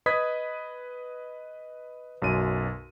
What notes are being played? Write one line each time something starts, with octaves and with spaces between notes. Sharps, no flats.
B4 D#5 B5 D#6 G#6 B6
B1 F#2 D#7